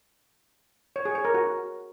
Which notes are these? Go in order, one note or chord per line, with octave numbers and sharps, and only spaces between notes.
C#5
G#4
C#5
A#4
F#4